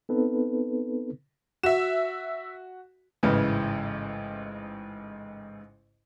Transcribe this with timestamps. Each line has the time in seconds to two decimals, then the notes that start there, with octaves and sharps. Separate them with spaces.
0.09 B3 C4 D#4 A4 B4
1.63 F#4 E5 E7
3.23 A1 G#2 C#3 E3